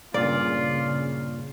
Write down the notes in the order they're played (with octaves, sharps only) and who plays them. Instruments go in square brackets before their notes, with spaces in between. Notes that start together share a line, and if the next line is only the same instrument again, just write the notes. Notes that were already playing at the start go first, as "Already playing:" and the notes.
[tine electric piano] G2 A#2 [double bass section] C#3 [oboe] F4 [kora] D5